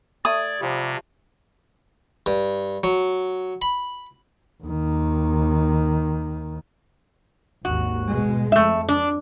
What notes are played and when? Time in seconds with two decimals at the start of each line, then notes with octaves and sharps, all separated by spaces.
0.25 A3 D5 D#6 G#6
0.61 C3 F3 G3
2.26 G2
2.84 F#3
3.62 B5
4.63 D#2 D#3
7.65 G#1 D#2 F#4
8.10 B2 G#3
8.52 F2 A3 E5
8.89 D4